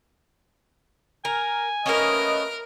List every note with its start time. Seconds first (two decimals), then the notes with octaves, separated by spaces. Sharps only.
1.25 A#4 G#5
1.86 A3 A#3 C#4 A#4 B4 D#5